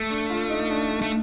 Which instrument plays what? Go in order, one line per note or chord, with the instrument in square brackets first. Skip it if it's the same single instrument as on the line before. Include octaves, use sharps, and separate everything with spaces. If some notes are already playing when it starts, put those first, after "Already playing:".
Already playing: [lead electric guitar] A3
[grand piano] D4
F4
D#4
D4
D4
[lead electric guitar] A3